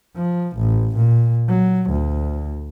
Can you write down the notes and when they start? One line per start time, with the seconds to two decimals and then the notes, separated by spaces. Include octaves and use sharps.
0.16 F3
0.57 A1
0.97 A#2
1.48 F#3
1.91 D2